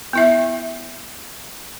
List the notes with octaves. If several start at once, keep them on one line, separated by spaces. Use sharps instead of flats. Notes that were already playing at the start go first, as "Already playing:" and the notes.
B3 E4 E5